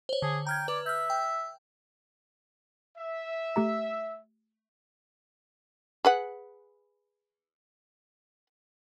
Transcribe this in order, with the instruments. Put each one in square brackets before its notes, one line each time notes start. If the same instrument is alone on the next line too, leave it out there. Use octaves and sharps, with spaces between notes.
[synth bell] C5 C#5
[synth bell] D3 [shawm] G#4
[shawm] G5 [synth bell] A#5 F6 G#6
[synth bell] B4 [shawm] D5
[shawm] E5 [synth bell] F6 G6
[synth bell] G5
[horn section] E5
[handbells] A3 G4 A#5
[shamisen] G#4 B4 F#5